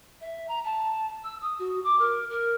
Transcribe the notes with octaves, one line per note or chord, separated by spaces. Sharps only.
E5
A#5
A5
E6
D#6
F#4
D6
A#4
A#4